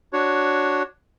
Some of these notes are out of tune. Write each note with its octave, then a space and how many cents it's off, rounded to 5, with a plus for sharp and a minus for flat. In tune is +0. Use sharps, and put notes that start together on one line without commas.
D4 +0 F#4 +0 C#5 +0